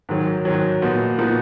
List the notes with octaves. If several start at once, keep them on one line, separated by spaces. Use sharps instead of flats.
G#2 D#3 F#3
G#2 D#3 F#3
A#2 F3 B3 D#4 F#4
A#2 F3 B3 D#4 F#4